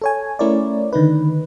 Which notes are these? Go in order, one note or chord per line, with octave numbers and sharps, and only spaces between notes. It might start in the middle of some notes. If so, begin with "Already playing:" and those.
A4 C#5 G#5
A3 C#4 E4 A#4 C#5 D5
D3 D#3 D#4 B4